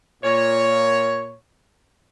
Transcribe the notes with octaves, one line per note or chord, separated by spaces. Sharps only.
A#2 C#5